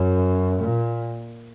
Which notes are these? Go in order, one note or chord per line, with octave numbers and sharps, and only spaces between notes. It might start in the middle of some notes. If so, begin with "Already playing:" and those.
Already playing: F#2
A#2